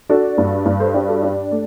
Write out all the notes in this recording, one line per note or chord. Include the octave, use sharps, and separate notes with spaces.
D4 F#4 A4
G2
G2
A4 C5
D4 G4
F#4 A4
D4 G4
A3